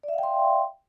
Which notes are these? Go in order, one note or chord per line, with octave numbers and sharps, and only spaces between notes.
D5 E5 F5 G5 C6